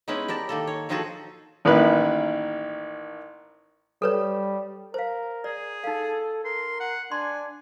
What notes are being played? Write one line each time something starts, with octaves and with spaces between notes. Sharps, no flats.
G#3 B3 C#4 D#4 E4
G4 A#4 D5 A5
D#3 A#3 A4
C#5
D#3 F3 D#4 F#4 G#4 A4
A1 D#3 A#3 E4 B4 F#6
G3 A4 B4 C#5
A#4 C5 F5
G#4 D5
D#4 A4 F5
A#4 C6
F#5
D4 G#5 C6